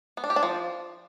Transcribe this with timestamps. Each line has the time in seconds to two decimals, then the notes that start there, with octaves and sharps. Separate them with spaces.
0.17 B3
0.24 D4
0.30 G4
0.36 D4
0.43 F3